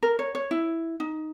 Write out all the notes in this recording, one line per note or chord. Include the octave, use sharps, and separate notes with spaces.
A#4
C#5
C#5
E4
D#4